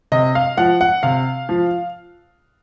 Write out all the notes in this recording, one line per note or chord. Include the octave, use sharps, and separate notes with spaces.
C3 D#5
F5
F3 F#5
F#5
C3 F5
F3